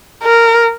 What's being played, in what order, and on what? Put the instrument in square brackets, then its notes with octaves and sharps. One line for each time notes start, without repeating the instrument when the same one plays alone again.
[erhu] A#4